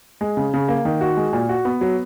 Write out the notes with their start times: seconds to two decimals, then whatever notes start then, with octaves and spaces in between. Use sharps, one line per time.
0.21 G#3
0.37 C#3
0.54 C#3
0.68 A#3
0.85 D#3
1.01 F#4
1.17 G#3
1.33 A#2
1.49 F#4
1.65 B3
1.81 F#3